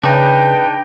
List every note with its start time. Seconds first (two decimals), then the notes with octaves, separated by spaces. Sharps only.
0.03 C#3 D4 D#4 B4 G5